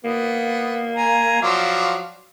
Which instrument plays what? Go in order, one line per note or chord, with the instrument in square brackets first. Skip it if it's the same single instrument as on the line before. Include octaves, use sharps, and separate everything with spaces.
[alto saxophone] A#3 [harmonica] B3
[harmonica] G#5 A#5
[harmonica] F3 F#3 D5 [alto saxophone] F5